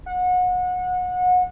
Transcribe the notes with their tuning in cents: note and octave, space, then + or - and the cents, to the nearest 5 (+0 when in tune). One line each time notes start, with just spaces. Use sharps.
F#5 -30